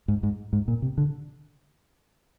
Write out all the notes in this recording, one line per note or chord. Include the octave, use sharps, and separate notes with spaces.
G#2
G#2
G#2
A#2
C3
D3